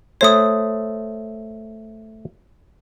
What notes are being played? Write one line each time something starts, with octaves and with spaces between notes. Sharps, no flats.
A3 C5 C#5 D#6